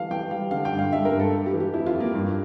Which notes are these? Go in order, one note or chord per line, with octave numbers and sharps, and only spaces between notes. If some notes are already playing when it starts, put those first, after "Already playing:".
Already playing: E3 G3 F5
E3 G5
G3 F5
D3 F5
G5
G2
F5
G2 E5
A#4
G2
A4
G3
G4
E3
G4
F2 E4
F4
F2
A#3
G2